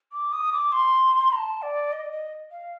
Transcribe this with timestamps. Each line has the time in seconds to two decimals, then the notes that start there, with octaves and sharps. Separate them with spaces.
0.12 D6
0.32 D#6
0.53 D6
0.72 C6
1.32 A#5
1.36 A5
1.62 D5
1.92 D#5
2.12 D#5
2.51 F5